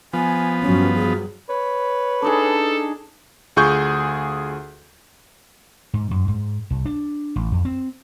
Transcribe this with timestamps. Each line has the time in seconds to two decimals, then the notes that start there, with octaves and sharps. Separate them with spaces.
0.13 F3 B3 G#5
0.62 G2 F#3 C#4
0.95 G#4
1.49 B4 C#5
2.22 D4 D#4 G#4 A4
3.56 D2 F4 G#4 C#6 G6
5.94 G#2
6.11 F#2
6.28 G#2
6.70 C2
6.85 D4
7.36 A1
7.52 F2
7.65 C4